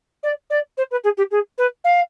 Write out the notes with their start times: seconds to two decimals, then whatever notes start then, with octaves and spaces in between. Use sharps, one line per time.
0.23 D5
0.50 D5
0.77 C5
0.91 B4
1.04 G#4
1.17 G4
1.31 G#4
1.58 B4
1.84 F5